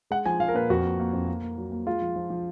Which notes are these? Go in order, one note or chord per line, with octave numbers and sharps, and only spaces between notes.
G#3 F#5
F3 G#5
F3 F5
A#4
A#2 B4
F2 F#4
A#3
A#3
F2
A#3
A#3
F#3
A#3
G#3 F4
F3
F3
F3